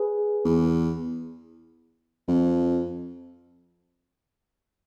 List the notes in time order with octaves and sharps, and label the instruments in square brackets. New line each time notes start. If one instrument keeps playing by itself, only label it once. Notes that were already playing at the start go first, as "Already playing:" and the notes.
Already playing: [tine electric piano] G#4 B4
[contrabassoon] E2
F2